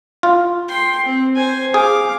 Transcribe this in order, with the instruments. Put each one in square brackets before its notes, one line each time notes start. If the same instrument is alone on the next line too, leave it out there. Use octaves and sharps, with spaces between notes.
[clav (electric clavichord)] F4
[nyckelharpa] G5 C6
C4
C5 G#5
[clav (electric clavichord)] G#4 [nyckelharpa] F5 D6